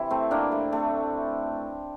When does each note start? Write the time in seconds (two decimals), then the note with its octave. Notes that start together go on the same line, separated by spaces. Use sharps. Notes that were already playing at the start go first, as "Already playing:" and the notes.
Already playing: C3 E3 E4
0.10 A3 C4
0.31 A#3 D4
0.52 A3
0.72 A3 C4